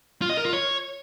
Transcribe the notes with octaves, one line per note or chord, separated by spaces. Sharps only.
F4
D#5
A#4
F4
C#5